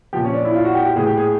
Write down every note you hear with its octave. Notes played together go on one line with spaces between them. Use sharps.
A#2 F3 G4
C#4
D4
E4
F4
F#4
G4
G4
A2 E3 G#4
G4
G#4